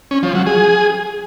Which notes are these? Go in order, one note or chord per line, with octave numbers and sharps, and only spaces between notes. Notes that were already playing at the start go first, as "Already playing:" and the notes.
C#4
F3
F#3
G#4